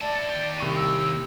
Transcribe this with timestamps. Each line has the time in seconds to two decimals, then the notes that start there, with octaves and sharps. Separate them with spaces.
0.01 E4 D5 A5
0.15 E4 A4
0.29 D#2 G4
0.58 C2 C#6 D#7
0.76 E6